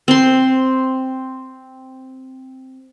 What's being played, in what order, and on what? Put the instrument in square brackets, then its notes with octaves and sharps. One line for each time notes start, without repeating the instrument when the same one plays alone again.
[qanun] C4 C6